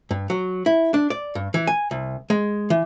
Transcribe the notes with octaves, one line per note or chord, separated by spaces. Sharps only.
G2
F#3
E4
D4
D5
G2
E3
G#5
C2
G#3
E3